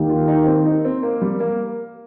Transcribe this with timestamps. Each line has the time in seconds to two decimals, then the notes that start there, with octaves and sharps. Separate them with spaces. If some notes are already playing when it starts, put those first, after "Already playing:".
Already playing: D#2 D#3 A#3 G4
0.09 F4
0.28 D#4
0.47 C4
0.66 D#4
0.85 C4
1.03 A#3
1.22 G3
1.40 A#3